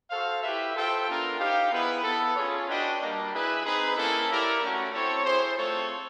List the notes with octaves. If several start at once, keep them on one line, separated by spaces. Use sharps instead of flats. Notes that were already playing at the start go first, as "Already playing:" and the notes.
F#4 A4 C5 F5
E4 G4 B4 E5
F4 A4 C5 E5 G5
B3 D4 F4 A#4
D#4 G4 C5 F5
B3 E4 G#4 B4
B3 E4 A4
C#4 F4 G#4 C#5
D4 F#4 B4 D#5 G5
G3 A#3 D4
E4 G#4 B4
C4 D#4 G#4 B4
A#3 C#4 E4 A4
E4 G4 A#4 D5
A3 C#4 F#4
C4 E4 A4 C#5
E4 G#4 C5
A3 C4 F4 A4 C#5